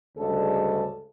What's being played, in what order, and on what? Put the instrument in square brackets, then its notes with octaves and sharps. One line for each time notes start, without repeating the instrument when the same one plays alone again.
[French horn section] D2 G2 C#3 G#3 A4